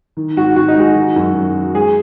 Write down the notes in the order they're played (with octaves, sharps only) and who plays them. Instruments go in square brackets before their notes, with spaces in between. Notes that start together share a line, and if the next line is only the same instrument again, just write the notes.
[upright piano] D#3
[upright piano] G#2 [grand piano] F#4
[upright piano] G#2 [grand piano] F#4
[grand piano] D#4
[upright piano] G#3 [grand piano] F#4
[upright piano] D#3
F#2
F#2
F#3
[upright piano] G#3 [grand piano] G#4